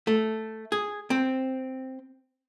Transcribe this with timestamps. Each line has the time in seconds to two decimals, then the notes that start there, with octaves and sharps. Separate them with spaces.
0.07 A3
0.72 G#4
1.10 C4